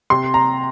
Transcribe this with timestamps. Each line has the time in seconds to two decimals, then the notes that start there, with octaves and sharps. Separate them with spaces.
0.10 C3 C6
0.34 A#5